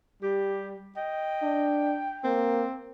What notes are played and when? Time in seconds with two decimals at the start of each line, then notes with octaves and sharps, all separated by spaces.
0.23 G3 G4
0.97 D#5 G5
1.42 D4
2.24 A#3 C4